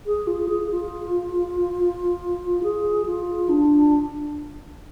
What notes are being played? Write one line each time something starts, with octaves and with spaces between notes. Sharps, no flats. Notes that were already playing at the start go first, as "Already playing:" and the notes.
G#4
F4
G#4
F4
G#4
F4
D4